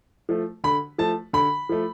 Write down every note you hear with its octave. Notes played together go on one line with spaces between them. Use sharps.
F3 A3
D3 B5
F3 A3 A5
D3 B5
F3 A3